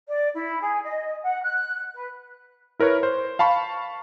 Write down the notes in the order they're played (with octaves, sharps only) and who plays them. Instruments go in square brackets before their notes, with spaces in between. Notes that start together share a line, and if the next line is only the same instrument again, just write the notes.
[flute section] D5
E4
G#4
D#5
F#5
F#6
B4
[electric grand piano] E4 A#4 B4 C#5
C5
F5 A5 B5 C#6